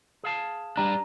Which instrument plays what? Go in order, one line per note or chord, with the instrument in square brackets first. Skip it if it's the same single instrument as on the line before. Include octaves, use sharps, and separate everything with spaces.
[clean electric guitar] G#4 F5 A5
[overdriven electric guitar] G3 D4 [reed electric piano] A#5